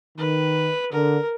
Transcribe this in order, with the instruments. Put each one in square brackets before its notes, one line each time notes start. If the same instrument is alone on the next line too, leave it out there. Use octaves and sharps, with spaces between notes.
[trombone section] D#3 [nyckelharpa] B4
[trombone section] D3 [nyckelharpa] A#4